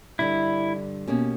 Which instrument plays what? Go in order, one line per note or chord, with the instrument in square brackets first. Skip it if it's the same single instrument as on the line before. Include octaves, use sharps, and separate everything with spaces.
[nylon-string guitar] G2 D3 G3 [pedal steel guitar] E4
[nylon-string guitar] B2 A#3 C#4 G4